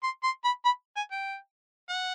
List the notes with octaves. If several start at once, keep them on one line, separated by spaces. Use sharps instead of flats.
C6
C6
B5
B5
G#5
G5
F#5